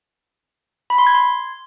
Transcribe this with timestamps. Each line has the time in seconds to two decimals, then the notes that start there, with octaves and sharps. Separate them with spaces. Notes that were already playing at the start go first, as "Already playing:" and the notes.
0.90 B5
0.98 C6
1.07 G#6
1.15 C6